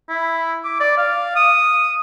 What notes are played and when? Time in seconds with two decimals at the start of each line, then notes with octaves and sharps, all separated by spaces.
0.09 E4
0.64 D6
0.80 D5
0.97 F5
1.36 D#6